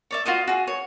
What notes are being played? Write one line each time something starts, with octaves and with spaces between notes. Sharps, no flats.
C#5 D5 E5
F4 F#4 C5 D#5
F#4 G#4
C#5